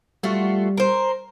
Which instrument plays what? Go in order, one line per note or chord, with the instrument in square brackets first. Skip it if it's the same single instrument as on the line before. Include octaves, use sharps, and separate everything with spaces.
[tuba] G3 [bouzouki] A3 F4 F#4
[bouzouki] A#4 C5